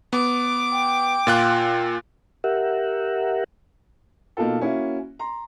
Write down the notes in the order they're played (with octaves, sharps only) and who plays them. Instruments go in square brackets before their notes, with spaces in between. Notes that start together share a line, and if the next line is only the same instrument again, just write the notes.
[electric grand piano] B3 [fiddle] D6
[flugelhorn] G5
[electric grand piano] A#2 F4 F#6
[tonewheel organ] G4 A#4 E5 F#5
[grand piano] B2 A#3 D#4 F4 A4
A#3 C#4 E4 F#4
A#5 C6